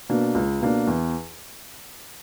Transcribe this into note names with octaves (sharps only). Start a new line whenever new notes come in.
B2 A#3 D4
C#2
B2 A#3 D4
E2